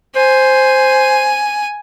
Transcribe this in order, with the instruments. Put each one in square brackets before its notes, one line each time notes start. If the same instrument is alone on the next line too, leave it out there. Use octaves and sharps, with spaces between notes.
[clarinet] C5 [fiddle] G#5